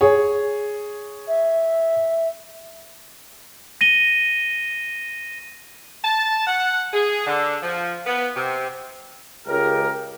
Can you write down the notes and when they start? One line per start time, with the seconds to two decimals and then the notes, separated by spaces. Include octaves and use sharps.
0.01 G#4 C#5
1.28 E5
3.81 A#6 D#7 G7
6.04 A5
6.46 F#5
6.93 G#4
7.26 D3
7.62 F3
8.05 B3
8.35 C3
9.48 C#2 G4 A#4